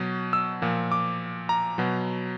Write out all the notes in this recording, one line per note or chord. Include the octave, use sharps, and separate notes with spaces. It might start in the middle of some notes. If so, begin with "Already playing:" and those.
Already playing: B2 F#3
E6
A#2 F3
D6
A#5
B2 F#3